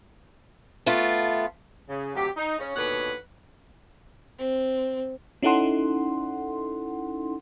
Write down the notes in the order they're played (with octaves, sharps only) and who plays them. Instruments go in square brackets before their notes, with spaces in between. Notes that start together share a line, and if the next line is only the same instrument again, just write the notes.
[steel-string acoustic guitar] A3 B3 F4
[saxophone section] C#3
D2 C3 F#3 G4
D#4
C#3 C#4
D#2 B2 D3 B4 C#5 F#5
[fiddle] C4
[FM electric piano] C#4 D#4 E4 A4 F#5 C6